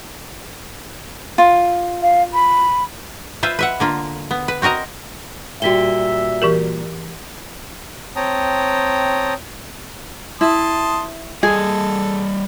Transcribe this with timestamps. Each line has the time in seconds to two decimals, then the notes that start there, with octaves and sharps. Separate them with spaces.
1.38 F4
2.02 F5
2.34 B5
3.43 F4 B4 C5 E5
3.59 B4 E5 F#5
3.80 D3 A#3 F4
4.31 B3
4.48 B4
4.62 C4 F#4 A#4 D#5 A#5
5.62 A#2 G3 F#4 E5 B6 G7
6.42 E3 G4 A#4
8.16 C4 C#5 G5 A5 A#5 D#6
10.41 E4 A5 C6 D#6
11.43 G3 G#4 A4 D#5